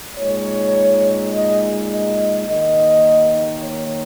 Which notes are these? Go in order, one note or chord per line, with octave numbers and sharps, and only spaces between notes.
A#2 G#3 D#4 C#5
D#5
D#5
D#2 D#3 A#3 D#5
C#5